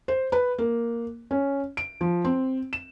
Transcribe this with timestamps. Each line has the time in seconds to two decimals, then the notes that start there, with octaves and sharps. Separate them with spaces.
0.08 C5
0.32 B4
0.58 A#3
1.31 C#4
1.77 D7
2.01 F3
2.24 C4
2.73 E7